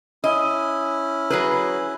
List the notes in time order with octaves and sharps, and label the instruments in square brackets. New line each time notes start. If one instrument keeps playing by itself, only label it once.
[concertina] C#4 E4 [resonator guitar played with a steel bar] D#5
[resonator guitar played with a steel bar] F#3 G#4 B4